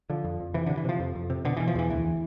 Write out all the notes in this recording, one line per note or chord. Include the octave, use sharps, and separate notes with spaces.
D3 F3
F2
F2
C3 E3
D3
C3
E3
C3 F3
F2
F2
C3
B2 D3
E3
B2
F3
E2 E3
D2 E3